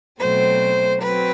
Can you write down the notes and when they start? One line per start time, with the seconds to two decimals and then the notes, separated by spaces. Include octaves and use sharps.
0.19 B2 F#3 A3 C4 C5
1.01 F#3 C4 B4